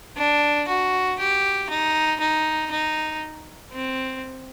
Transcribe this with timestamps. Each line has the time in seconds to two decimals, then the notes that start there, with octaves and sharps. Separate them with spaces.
0.18 D4
0.69 F#4
1.19 G4
1.70 D#4
2.21 D#4
2.71 D#4
3.73 C4